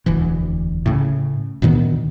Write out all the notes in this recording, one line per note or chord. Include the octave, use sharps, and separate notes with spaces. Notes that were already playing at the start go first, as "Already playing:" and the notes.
E1 D2 E3
A2 C#3
D2 A#2 D#3 B3